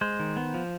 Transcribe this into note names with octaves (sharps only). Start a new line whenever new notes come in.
G#3 C5
D#3
B3
F3